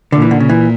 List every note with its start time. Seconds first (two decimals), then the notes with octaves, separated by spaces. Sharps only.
0.12 A#2 D3
0.22 E3
0.31 D3
0.40 C#3
0.50 E3